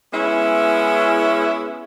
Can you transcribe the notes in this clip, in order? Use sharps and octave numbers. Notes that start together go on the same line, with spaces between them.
G#3 B3 C#4 E4